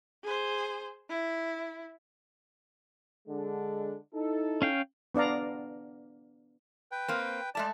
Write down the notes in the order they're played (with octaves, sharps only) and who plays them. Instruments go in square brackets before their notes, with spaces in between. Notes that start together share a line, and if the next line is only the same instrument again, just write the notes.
[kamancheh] G#4 C5
E4
[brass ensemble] D3 G#3 D4
D#4 E4 A4
[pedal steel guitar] C#4 F5 G5
[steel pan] B3 D4 D5 F5 A#5
[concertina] B4 G5
[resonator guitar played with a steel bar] A#3 C4
[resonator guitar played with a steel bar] G#3 A3 A5 [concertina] D5